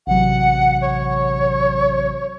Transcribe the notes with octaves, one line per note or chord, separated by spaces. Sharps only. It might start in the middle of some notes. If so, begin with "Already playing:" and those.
A1 C3 F#3 F#5
C#5